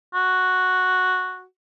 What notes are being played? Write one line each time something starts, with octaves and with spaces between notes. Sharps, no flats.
F#4